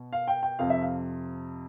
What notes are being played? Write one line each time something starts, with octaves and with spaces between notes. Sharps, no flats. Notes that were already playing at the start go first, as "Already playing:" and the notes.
Already playing: B2
F5
G5
G5
F2 C3 F3 F5
E5
F5